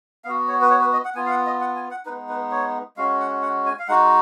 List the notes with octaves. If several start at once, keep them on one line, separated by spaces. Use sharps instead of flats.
B3 F#4 F5
C#5
B4
C#5
B4
D#5
F#5
B3 F4 G#5
F5
F#5
D#5
F#5
G#5
F#5
G#3 B3 D#4 B4
B4
C#5
G#3 C#4 F#4 F5
F#5
F#5
G#5
F5
G#3 D#4 F#4 F#5